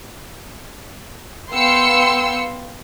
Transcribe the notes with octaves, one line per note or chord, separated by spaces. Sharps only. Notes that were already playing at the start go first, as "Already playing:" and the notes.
B3 F5 G5 C6 E6 C#7